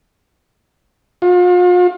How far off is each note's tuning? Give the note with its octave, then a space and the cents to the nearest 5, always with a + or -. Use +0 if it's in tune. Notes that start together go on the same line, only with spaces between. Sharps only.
F4 +40